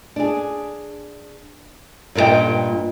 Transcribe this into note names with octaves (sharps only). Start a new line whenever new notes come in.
D4 G#4
G2 A#2 A#4 D#5 G5